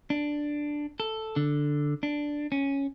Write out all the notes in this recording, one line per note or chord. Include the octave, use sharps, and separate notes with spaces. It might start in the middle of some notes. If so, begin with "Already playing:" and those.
D4
A4
D3
D4
C#4